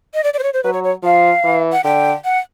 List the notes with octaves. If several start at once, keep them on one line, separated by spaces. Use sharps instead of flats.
D#5
D5
D5
C5
C#5
C5
F#3 B4
C#5
C#5
F3 F5
E3
F#5
D3 G5
F#5